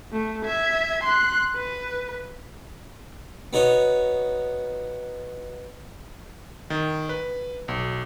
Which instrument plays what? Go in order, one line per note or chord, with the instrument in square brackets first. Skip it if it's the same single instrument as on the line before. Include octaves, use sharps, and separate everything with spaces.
[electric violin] A3
E5 G#6
C6 F#6
B4
[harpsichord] B3 D#4 F#4 C#5
[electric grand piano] D#3
B4
B1